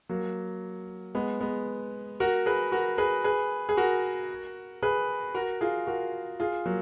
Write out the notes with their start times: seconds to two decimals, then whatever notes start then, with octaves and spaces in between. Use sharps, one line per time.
0.09 F#3 A#3
1.15 G#3 B3
1.40 G#3 B3
2.20 F#4 A#4
2.46 G#4 B4
2.72 F#4 A#4
2.98 G#4 B4
3.24 G#4 B4
3.69 G#4
3.77 F#4 A#4
4.83 G#4 B4
5.34 F#4 A#4
5.61 F4 G#4
5.87 F#4 A#4
6.40 F4 G#4
6.66 F#3 A#3